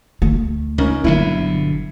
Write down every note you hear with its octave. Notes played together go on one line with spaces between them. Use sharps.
D2 A3
C#2 C#4 D#4 A#4
G1 B2 D3 F#3 E4